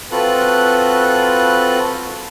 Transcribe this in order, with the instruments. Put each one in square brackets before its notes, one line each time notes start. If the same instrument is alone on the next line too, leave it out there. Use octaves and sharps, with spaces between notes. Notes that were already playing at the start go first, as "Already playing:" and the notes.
[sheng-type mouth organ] C4 F4 F#4 A4 B4 F#6